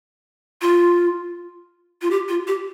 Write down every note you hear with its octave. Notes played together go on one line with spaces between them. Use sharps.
F4
F4
G4
F4
G4